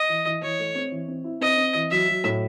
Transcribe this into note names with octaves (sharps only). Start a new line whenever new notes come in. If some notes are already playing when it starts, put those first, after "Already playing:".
Already playing: D#5
E3
E3
E3 C#5
A3
C4
E3
C4
E4
C4 D#5
C4
E3
F#3 E5
F#3
A2